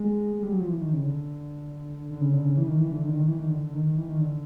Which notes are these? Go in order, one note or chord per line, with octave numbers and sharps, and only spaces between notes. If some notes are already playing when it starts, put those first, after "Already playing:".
Already playing: G#3
G#3
G3
F#3
F3
E3
D#3
C#3
D3
D3
C#3
D3
C#3
E3
D#3
E3
D3
D#3
D3
D#3
E3
D#3
D3
D3
D#3
D#3
E3
D#3
D3